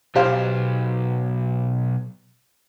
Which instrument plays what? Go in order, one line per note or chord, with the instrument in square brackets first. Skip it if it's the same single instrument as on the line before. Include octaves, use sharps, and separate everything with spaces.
[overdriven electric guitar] B1 [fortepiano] G4 C5 F5